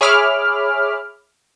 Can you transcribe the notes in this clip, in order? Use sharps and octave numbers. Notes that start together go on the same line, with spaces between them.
G#4 C#5 E5 B5 D6 F6